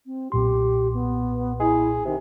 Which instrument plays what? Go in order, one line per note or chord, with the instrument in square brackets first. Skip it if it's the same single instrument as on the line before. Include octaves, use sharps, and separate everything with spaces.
[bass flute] C4
[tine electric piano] B1 A#2 C6 [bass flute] G4
[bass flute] B3
[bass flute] E4 [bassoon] G#4
[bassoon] C3 [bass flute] D#3